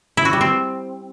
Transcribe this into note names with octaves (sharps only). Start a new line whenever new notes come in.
E4
F#4
G3
C4